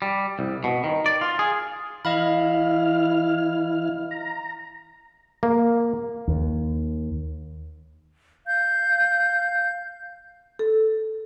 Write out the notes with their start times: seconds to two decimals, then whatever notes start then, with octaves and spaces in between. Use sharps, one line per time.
0.02 G3
0.39 C2
0.64 B2
0.84 D#3
1.06 D5
1.21 F4
1.39 G#4
2.05 E3 E4 D#5 F5 B5 F6
4.11 A#5
5.43 A#3
6.28 D#2
8.46 F5 G6
10.59 A4